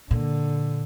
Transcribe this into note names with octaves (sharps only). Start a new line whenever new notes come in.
A#2 D3